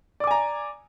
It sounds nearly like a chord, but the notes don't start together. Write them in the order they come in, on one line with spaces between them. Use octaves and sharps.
D5 D6 G#5 A#5